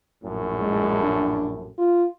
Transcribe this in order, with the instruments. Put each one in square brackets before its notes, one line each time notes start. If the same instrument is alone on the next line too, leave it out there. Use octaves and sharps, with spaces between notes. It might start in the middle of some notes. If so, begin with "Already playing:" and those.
[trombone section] A#1 F#2 A2
[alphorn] G#3
D4
F4